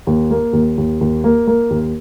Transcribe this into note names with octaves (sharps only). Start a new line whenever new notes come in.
D#2
A#3
D#2
D#2
D#2
A#3
A#3
D#2